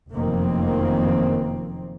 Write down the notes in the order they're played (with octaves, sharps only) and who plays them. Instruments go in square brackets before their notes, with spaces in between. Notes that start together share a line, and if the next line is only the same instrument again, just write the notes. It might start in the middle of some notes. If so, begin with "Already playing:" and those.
[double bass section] F1 F#2 D#3 F3 A#3 C4